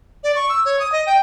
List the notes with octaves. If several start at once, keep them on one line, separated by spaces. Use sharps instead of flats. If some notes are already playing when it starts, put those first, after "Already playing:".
D5
C#6
E6
C#5
D#6
D#5
G5